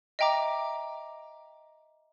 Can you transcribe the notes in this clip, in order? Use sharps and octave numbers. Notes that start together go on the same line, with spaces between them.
D#5 E5 G5 A#5 D6